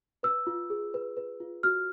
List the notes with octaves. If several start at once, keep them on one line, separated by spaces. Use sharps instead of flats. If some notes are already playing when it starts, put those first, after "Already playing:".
B4 E6
F4
G#4
B4
B4
F4
F#4 F6